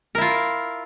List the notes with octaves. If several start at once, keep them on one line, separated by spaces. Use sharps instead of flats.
E4 F4 A#4